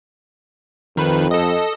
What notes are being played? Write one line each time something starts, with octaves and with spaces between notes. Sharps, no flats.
F2 D#3 B4
A4 D#5